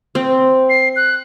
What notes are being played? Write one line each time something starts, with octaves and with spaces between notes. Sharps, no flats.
C4
C7
F#6